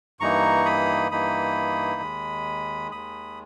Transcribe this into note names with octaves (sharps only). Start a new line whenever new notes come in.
G2 E3 A#3 D#4 A#5 C#6
B5 D#6
G2 E3 A#3 D#4 B5 D#6
D#2 D#3 G#3
D#2 D#3 G#3 B5 D#6